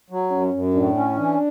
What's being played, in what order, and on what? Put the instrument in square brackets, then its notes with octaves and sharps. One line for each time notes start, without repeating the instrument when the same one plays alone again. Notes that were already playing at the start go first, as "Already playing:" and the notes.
[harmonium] F#3
[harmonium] F#2 [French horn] C#4
[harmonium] F#2
[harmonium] A2 [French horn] D4
[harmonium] C#4
[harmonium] E3 [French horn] D4